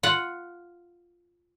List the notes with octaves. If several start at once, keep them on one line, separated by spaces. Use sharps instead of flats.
F4 F#5